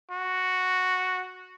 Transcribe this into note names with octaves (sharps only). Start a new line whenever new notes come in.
F#4